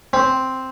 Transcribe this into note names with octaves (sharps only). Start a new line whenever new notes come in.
C4